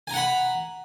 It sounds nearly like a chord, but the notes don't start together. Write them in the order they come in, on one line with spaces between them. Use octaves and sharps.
G#5 A#5 F#5 B5